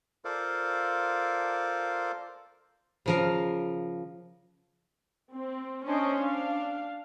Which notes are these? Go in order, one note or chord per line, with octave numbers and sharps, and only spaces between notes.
F4 A4 A#4 C5 D5 F5
C#3 F3 A#4
C4
C#4 D4 C5 D#5
D4 F5